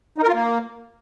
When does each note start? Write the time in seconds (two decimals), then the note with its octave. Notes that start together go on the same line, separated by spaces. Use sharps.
0.18 D#4
0.23 A#4
0.28 F4
0.33 A#3